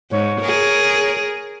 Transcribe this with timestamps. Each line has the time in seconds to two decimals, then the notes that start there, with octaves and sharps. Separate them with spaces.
0.11 G#2 C#5
0.41 G#4 A#4